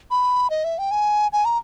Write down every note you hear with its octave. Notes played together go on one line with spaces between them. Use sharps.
B5
D#5
E5
G5
G#5
G#5
A#5